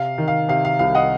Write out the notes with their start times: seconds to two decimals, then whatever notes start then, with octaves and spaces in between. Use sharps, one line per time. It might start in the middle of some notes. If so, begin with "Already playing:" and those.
Already playing: C3 F5
0.18 D#3
0.28 F5
0.49 C3 F5
0.65 F5
0.79 C2 F5
0.95 D#5 F#5